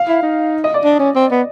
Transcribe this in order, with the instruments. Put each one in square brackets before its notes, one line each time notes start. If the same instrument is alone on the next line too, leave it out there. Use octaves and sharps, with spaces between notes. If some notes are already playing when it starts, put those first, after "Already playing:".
Already playing: [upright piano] F5
[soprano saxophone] E4
D#4
[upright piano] D#5
D5
[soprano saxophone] D4
C#4
C4
B3